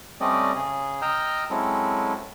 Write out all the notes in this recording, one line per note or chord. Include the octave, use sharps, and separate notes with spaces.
G3 A3 C4 C#4 D5 D#5
C#3 G#4
D#5 G5 A#5 E6 F6 G6
F#3 G#3 C4 C#4 E4 A4